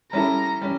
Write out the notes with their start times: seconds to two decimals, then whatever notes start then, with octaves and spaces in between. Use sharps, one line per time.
0.12 G3 C#4 E4 A4 A#5
0.61 G3 C#4